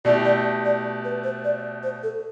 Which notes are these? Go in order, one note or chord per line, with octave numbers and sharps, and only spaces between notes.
B2 A3 E4 G4 D5
D5
D5
B4
C5
D5
C5
A4